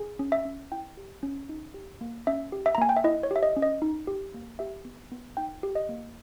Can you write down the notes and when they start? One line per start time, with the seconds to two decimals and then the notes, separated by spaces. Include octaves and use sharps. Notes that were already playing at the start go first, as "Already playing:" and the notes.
Already playing: G#4
0.19 C#4
0.32 E5
0.45 C#4
0.72 E4 G5
0.97 G4
1.23 C#4
1.49 D#4
1.74 G4
2.01 A#3
2.27 C#4 E5
2.52 G4
2.66 E5
2.75 A#5
2.78 A#3 G#5
2.89 G5
2.97 E5
3.04 E4 D#5
3.23 C#5
3.31 G4 E5
3.43 D#5
3.57 C#4
3.62 D#5
3.82 D#4
4.07 G4
4.34 A#3
4.59 G4 E5
4.85 B3
5.11 B3
5.37 D#4 G5
5.63 G4
5.75 D#5
5.89 A#3